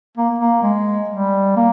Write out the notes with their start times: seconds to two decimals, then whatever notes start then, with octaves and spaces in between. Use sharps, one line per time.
0.17 A#3
0.38 A#3
0.63 G#3
1.10 G3
1.56 A#3